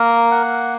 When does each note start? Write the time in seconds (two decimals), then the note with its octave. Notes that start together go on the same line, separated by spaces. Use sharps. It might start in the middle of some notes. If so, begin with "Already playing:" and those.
Already playing: A#3 A#4
0.31 F#5